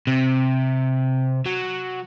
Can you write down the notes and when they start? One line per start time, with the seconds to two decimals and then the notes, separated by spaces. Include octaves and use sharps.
0.07 C3
1.46 F#3